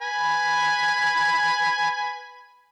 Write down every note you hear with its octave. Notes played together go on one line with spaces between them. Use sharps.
B4 G#5 B5